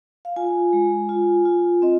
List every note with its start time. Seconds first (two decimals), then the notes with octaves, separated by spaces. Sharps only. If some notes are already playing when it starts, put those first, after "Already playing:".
0.25 F5
0.36 F4 G#5
0.73 G#3
1.09 F4
1.45 F4
1.82 C4 D#5